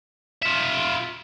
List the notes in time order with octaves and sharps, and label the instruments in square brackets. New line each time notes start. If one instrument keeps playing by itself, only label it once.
[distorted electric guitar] F4 E5